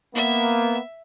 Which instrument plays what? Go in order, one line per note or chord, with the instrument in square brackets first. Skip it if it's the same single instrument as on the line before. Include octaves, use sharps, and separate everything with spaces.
[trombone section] A#3 B3 [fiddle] E5